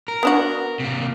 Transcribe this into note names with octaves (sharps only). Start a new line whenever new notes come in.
A#4
B3 D4 F#4
C3 A#3